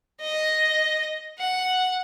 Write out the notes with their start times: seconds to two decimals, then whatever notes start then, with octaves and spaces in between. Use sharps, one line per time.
0.21 D#5
1.39 F#5